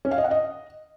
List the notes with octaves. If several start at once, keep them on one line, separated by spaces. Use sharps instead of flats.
C#4
F5
D#5
F#5
D#5